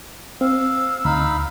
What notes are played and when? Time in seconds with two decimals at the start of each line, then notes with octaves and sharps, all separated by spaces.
0.41 C4 F5 E6
1.05 D2 D#4 F5 B5